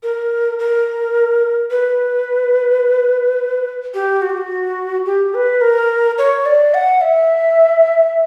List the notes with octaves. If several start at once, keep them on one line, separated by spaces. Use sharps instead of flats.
A#4
A#4
B4
G4
F#4
G4
F#4
G4
B4
A#4
C#5
D5
F#5
E5